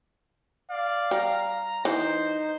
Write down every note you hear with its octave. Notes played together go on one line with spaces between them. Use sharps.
D5 F5
G3 A#5
E3 D#4 C5